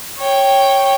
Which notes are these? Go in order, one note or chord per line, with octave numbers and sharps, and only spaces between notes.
C#5 G5